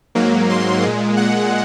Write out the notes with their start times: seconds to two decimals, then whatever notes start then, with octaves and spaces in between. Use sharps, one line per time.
0.15 G#2 F#3 A#3
0.49 C6
0.83 A#2 G#3
1.17 F#5